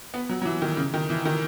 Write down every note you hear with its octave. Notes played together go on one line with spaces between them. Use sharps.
B3
F#3
F#3
E3
D#3
C#3
D#3
E3
D#3